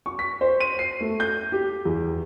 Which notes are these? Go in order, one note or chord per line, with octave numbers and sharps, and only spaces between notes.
C#6
B6
C5
D#7
C7
A3
G6
G4
E2